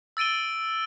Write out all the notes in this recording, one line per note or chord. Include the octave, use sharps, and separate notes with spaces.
E6 A6 D7 D#7 G7